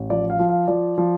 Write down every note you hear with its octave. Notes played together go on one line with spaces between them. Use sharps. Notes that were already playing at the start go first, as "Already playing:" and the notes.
Already playing: A1
F3 D5
F5
F3
F5
F3 D5
F3